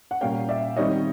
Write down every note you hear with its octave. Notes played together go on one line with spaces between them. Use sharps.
F#5
A#2 G3 A#3 C#4 F5 G5
D5 E5
D#3 G3 C4 C#5 D#5